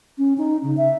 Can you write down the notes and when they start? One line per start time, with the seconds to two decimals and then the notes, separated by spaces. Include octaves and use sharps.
0.18 C#4
0.38 D#4
0.63 C#3
0.77 E5